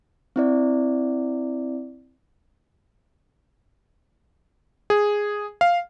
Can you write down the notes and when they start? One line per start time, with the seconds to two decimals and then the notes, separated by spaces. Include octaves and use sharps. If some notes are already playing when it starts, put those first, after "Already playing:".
0.36 C4 E4 D5
4.90 G#4
5.61 F5